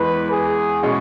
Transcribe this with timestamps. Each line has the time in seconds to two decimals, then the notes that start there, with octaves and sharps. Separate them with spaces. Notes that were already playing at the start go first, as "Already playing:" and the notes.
Already playing: E2 E3 G#3 B4
0.31 G#4
0.82 B2 G#3 C#4 E4